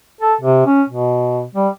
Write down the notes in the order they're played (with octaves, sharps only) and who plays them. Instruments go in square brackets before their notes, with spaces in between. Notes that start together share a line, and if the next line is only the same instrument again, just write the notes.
[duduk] A4
C3
C#4
B2
G3